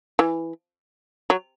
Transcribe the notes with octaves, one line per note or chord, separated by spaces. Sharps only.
E3
F#3